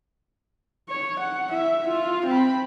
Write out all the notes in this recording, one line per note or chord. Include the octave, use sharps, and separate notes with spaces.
C#5
F#5
E4 E5
F4
C4 B5